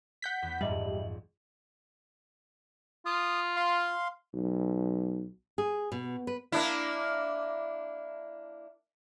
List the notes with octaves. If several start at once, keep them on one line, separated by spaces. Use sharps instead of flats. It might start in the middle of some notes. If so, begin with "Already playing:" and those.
F#5 G6 B6
E2 B3
A#1 F2 G#2 G3 D#5 E5 F#7
F4 D#6
F5 C6
B1
G#4
B2
B4
A#3 D4 E4